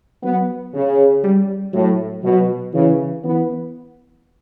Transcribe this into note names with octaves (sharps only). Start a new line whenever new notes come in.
F#3 B3
C#3
G3
A2 F#3
B2 F#3
C#3 E3
E3 B3